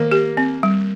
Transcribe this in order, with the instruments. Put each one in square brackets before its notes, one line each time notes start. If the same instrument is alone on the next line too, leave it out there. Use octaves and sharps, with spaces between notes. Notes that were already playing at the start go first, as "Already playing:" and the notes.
Already playing: [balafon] D#3 [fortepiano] A#3
[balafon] G4
C4
G3